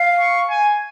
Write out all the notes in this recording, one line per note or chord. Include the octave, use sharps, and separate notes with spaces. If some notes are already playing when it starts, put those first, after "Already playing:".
Already playing: F5
C#6
G#5